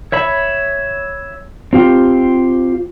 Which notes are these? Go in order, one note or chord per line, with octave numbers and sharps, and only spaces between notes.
C#5 E5 B5
C4 F4 G4